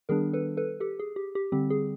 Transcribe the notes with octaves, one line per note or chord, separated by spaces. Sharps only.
D#3 G3 B3 D4 G#4 A#4
A4 B4
A4 B4
G4 A4
G#4
G4
G4
D3 G3 C4 G4
G#4